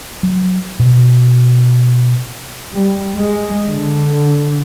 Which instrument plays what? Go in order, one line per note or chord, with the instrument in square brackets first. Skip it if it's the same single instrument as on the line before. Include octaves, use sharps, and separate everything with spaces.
[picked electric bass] F#3
B2
[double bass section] G3
G#3
D3